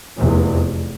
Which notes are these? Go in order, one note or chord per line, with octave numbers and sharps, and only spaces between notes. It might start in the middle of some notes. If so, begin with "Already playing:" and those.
F1 E2 C3